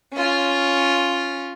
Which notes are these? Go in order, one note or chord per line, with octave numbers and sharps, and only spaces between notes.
C#4 F4